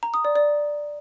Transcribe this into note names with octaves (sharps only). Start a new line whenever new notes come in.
A#5
D#6
D5
D5